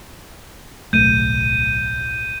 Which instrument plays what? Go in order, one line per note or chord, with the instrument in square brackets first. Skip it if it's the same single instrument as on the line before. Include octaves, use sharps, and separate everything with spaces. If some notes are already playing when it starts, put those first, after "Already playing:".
[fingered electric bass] D1 B1 A3 [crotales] G6 D#7